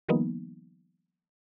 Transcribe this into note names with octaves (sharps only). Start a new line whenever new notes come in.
D#3 F3 G3 A#3 B3 D#4